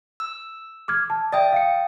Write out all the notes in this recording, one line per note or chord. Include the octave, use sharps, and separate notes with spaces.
E6
D6 F6 G#6
A5
D5 E5 G5 D#6 A6
F5 C#7